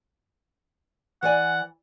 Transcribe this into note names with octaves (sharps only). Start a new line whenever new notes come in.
E3 D5 F#5 G#5